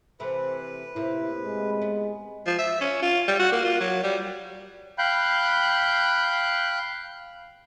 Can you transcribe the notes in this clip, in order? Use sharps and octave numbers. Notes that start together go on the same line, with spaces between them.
C3 E3 A3 B4
A2 C3 A#3 E4
G#3
B3
F3
E5
C#4
F4
G3
F#4
A#3
F4
F#3
G3
F5 G5 B5 F#6 G6